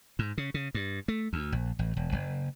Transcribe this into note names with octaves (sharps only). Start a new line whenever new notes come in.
G#2
C#3
C#3
G2
A3
D2
A#1
A1
E1
F#1